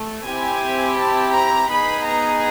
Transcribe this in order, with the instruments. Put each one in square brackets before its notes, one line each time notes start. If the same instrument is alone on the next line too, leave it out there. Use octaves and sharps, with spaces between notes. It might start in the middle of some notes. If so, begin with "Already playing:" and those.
Already playing: [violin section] A3
C4 E4 G4 G#5
A5
A#5
B3 D#4 G#4 B5
A#5